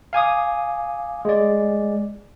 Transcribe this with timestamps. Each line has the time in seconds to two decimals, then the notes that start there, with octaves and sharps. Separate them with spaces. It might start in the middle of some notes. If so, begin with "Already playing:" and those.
0.13 F5 G#5 D6 D#6
1.25 G#3 D5